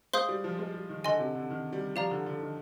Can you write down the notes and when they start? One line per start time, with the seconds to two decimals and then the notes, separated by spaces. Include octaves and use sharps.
0.13 G#3 C5 F5 C6 D#6 G6
0.29 G3
0.44 F3
0.59 G#3
0.74 G3
0.89 D#3
1.04 D3 D#5 G#5 C6
1.20 C3
1.35 D3
1.50 D#3
1.73 G3
1.96 F3 G4 D5 F5 A#5
2.11 D3
2.26 D3
2.41 D#3